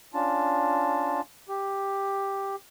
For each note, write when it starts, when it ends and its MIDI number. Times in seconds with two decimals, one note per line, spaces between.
0.14 1.21 61
0.14 1.21 62
0.14 1.21 65
0.14 1.21 81
1.49 2.56 67